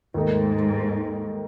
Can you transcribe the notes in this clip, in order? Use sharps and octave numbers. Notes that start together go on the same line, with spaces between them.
D#2 G#2 D#3 A3 D#4